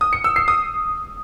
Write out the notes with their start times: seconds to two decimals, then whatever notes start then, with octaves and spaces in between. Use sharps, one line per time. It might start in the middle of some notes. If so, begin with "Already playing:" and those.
0.01 D#6
0.13 C#7
0.24 E6
0.36 C7
0.48 D#6